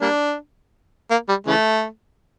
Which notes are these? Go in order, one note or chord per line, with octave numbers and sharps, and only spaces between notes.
G3 A#3 D4
A#3
G3
C#3 E3 A3